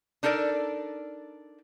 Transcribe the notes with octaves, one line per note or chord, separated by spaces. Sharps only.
D4 D#4 A4 A#4 D5